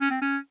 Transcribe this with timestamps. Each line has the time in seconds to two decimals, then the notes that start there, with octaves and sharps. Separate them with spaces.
0.01 C#4
0.11 C4
0.22 C#4